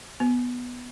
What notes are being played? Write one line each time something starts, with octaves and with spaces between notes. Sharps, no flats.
B3